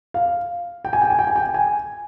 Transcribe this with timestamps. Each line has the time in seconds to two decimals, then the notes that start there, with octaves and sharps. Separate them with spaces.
0.14 F5
0.85 G5
0.93 G#5
1.01 G5
1.10 G#5
1.19 G5
1.27 G#5
1.36 G5
1.54 G#5